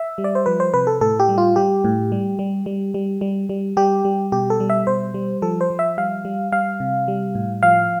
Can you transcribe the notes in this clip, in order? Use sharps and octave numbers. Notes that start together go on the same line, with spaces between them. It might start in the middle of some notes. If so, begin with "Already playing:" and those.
Already playing: E5
G3
D5
C5
F3 B4
C5
C3 B4
A4
A2 A4
G4
G3
F4
G3 G4
A2
G3
G3
G3
G3
G3
G3
G3 G4
G3
B2 G4
A4
G3
E5
B2 C5
G3
F3 A4
C5
F3
E5
G3 F5
G3
G3 F5
C3
G3
A2
F3 F5